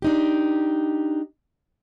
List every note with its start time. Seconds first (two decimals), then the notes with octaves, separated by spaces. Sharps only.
0.02 D4 D#4 G4